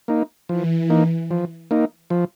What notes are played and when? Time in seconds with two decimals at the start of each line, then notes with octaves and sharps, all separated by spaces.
0.08 A#3 D#4
0.49 E3 F3
0.90 A#3 D#4
1.31 F3
1.71 A#3 D#4
2.10 F3